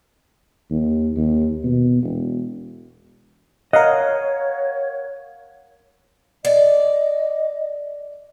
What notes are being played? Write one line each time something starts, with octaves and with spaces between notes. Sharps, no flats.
D#2
D#2
B2
E1
A#4 C#5 D#5 F5 F#5
D5 D#5